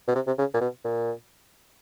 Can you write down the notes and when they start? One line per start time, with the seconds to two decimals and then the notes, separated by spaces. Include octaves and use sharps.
0.08 B2
0.15 C3
0.27 C3
0.38 C#3
0.54 A#2
0.61 B2
0.84 A#2